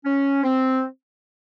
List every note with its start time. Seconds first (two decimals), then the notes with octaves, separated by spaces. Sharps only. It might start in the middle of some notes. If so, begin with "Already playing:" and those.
0.05 C#4
0.44 C4